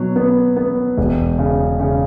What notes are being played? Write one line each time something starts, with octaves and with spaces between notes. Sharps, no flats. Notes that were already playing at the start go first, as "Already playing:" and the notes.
Already playing: B2 F#3
B3
B3
E1
C#3
C#3